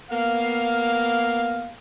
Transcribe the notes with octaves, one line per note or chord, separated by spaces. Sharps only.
A#3 B3 F5